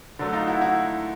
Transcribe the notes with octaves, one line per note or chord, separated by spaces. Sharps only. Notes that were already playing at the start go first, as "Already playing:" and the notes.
D3 F#3 A3
D#4 F4
E4 F#4
E4 F#4